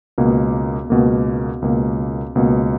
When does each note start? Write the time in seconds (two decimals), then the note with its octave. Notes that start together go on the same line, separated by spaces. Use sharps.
0.18 C#2 B2 A#3
0.90 C#2 B2 A#3
1.62 C#2 B2 A#3
2.35 C#2 B2 A#3